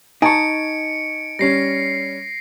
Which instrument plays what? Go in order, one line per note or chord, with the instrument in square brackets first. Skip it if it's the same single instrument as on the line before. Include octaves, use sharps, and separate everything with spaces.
[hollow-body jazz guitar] D#4 [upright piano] G#5 A5 C#6 [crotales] C#7 D7
[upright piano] G3 C#4 [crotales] A#6 C7